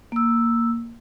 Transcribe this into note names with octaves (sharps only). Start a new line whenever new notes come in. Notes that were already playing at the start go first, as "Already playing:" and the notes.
A#3 E6